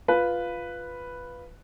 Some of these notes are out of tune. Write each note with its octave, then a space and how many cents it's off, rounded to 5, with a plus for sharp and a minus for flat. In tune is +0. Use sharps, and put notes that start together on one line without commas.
F4 +0 B4 +0